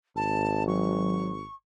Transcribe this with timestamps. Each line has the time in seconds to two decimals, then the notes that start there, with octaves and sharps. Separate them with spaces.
0.16 G#1 A5
0.67 F#3 C#6